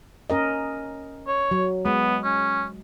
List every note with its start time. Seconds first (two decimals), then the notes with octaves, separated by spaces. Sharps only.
0.30 C#4 A#4 D#5
1.27 C#5
1.51 F#3
1.85 G#3 B3
2.24 C#4